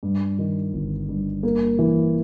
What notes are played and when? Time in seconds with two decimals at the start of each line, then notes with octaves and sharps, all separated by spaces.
0.03 G2
0.39 D#3
0.73 G1
1.09 G2
1.43 A#3
1.79 E3